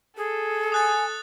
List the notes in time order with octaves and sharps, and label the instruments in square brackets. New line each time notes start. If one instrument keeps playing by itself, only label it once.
[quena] G#4 [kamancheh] A4
[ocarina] G#5 [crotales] D#6 F#6 A6